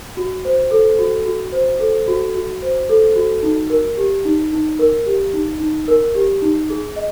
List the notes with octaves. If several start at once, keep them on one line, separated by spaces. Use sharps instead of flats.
F#4
C5
A4
F#4
F#4
C5
A4
F#4
F#4
C5
A4
F#4
D#4
A#4
G4
D#4
D#4
A#4
G4
D#4
D#4
A#4
G4
D#4
G#4
D#5